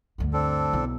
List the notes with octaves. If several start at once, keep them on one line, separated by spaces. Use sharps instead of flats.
D2 G2
C4 D4 A4
B1 E4